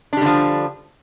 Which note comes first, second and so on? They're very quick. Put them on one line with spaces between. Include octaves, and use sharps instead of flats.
D4 G3 D3 F3